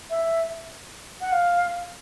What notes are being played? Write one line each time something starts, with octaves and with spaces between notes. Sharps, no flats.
E5
F#5
F5